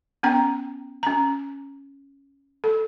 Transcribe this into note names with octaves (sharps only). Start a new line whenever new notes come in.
B3 C#4 G5 A#5
C#4 A#5
A4